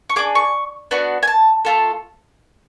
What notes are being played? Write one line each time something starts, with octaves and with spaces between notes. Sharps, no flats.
C#6
D4 G#4 D6
C#6
B3 D4 F#4
G#5
A5
A3 F4 A4